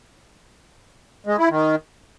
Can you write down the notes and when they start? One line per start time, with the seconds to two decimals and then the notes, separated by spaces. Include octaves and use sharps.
1.27 G#3
1.38 E4
1.50 D#3